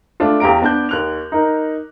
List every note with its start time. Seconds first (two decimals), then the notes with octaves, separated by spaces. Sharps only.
0.20 A3 D4 F4
0.40 E2 G4 F5 A#5 D7
0.62 B3 D4 A5 F#6 G6
0.89 D#2 F#6 F7
1.32 D#4 A#4